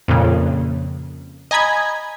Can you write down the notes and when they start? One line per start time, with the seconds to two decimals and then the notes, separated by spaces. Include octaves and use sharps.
0.08 F2 A#2 C#3
1.51 D#5 G#5 A#5 B5 G#6